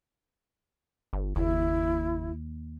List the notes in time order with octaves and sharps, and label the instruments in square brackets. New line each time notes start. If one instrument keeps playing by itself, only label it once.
[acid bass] G1
[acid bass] F#1 [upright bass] D#2 A#3 [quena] E4